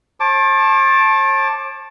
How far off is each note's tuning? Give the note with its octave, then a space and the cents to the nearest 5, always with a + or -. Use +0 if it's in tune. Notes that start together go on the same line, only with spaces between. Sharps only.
C#5 -45 A5 +0 D6 +0